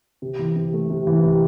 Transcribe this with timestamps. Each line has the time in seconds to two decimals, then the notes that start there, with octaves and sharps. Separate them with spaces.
0.22 C3
0.39 E3
0.56 C3
0.73 A3
0.90 C3
1.07 E3
1.23 C3